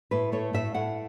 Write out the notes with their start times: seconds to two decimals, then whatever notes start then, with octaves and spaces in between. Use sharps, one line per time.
0.11 A2 B4
0.32 A3 C#5
0.53 A2 E5
0.74 A2 F#5